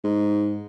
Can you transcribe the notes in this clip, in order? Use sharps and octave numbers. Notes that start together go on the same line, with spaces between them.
G#2